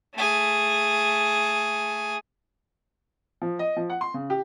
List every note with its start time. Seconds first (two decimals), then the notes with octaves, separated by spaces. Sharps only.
0.15 A3 G#4
3.42 F3
3.59 D#5
3.77 F3
3.90 F#5
4.01 C6
4.14 C#3
4.30 G4